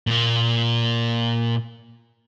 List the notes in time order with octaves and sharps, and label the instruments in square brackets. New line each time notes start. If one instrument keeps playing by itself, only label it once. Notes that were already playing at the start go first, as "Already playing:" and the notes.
[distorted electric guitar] A#2 A#3